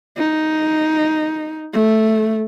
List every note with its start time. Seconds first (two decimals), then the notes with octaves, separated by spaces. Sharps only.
0.18 D#4
1.73 A3